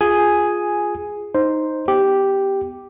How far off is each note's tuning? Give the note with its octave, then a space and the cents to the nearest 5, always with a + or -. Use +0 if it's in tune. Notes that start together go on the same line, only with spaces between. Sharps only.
F4 +0 G#4 +0 G#5 +5
D#4 +0 C5 +0
B3 +20 G4 +0